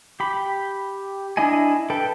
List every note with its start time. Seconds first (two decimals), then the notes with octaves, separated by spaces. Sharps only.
0.20 G4 B5
1.37 D4 E4 D#5 G#5
1.90 A4 B4 G5